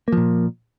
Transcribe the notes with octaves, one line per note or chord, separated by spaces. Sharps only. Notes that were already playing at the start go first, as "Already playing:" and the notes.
A#2 F3 A#3